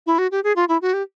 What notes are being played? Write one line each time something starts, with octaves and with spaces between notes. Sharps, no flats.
E4
F#4
G4
G#4
F4
E4
F#4
G4